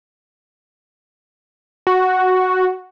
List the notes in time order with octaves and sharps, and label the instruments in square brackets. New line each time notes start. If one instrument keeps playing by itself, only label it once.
[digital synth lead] F#4